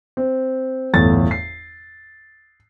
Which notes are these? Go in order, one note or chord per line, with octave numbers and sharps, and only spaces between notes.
C4
G1 E2 A2 A6
C7